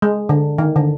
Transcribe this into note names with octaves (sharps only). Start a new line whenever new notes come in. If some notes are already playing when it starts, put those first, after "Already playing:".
G#3
D3
D#3
D3